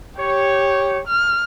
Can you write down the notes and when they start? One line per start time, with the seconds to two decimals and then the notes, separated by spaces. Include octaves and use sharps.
0.19 G4 C#5
1.07 F6